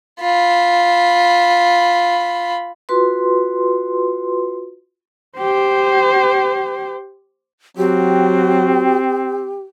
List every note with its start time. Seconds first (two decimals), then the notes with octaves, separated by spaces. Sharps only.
0.20 F4 B5
2.89 F4 F#4 B4 C6
5.37 G4 C5
7.77 F#3 C4 F#4 G4